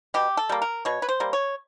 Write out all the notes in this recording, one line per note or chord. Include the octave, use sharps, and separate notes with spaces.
B2 G4
A4
G3 A#3
A#4
B2 C#5
B4
C5
G3 A#3
C#5